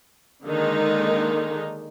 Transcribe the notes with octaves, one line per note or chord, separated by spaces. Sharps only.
D3 D#3 G#3 A#3 D#4